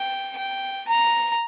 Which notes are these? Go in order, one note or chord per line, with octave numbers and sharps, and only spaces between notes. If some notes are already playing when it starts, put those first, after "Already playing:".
Already playing: G5
G5
A#5